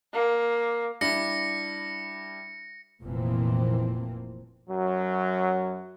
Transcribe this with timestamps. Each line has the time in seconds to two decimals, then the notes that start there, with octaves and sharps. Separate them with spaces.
0.13 A#3
1.01 G3 D4 E4 A#6 C#7
3.03 F1 A#2 E3 F3 A#3 C4
4.69 F#2 F#3